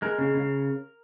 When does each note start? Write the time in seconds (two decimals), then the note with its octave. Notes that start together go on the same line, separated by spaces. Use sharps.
0.02 G#3 A#4
0.18 C#3
0.34 C#3